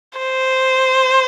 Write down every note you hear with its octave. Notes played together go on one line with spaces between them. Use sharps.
C5